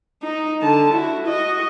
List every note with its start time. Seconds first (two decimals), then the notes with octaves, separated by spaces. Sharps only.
0.22 D#4
0.62 D3 A5
0.93 E4 F#4
1.27 F#4 D#5